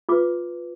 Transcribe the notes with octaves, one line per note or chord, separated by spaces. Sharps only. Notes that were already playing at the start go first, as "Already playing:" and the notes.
F4 B4 D6